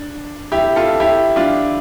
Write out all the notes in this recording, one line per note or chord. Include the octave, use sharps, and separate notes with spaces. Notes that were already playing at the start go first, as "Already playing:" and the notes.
Already playing: D4
E4 G4
F4 A4
E4 G4
D4 F4